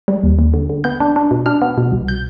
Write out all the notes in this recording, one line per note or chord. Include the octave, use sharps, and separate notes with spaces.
G3
D#2
D#2
D3
D3
B3 G6
D4
D4
B2
D4 F6
B3
B2
C2
G6